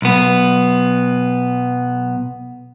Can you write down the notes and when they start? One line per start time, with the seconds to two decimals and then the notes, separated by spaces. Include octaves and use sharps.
0.02 B1 B3